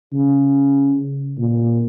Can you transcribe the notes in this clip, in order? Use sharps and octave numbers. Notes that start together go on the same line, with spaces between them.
C#3
A#2